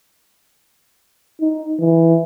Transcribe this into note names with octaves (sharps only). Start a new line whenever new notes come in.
D#4
E3